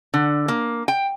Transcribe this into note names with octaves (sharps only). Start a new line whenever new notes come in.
D3
A#3
G5